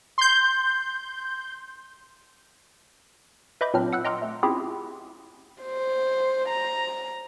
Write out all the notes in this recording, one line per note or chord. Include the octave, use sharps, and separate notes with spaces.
C6 G6
B4 D#5 E5 B5 D6 G6
A#2 F#3 C4 D4 F6
F#5 E6 F#6
D#5 G5 A#5 C6 D6 F6
A3
C4 C#4 E4 F4 G4 G#4
C5
A#5